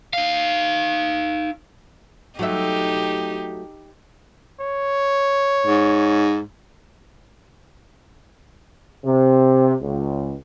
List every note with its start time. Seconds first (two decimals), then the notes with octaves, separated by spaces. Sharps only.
0.13 D#4 F5
2.39 F#3 A3 D#4 G4 E5
4.60 C#5
5.67 G#2
9.05 C3
9.82 C#2